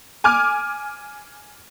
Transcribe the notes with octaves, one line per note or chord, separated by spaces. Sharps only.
G#5 D6 F6